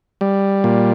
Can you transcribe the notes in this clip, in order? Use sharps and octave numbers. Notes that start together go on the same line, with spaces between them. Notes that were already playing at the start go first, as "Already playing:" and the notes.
G3
A#2